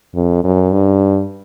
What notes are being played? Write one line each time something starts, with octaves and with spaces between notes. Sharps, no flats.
F2
F#2
G2